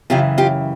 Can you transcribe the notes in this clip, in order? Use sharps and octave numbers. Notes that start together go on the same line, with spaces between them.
F#2 C#3 E3 F4 G4
F4 G4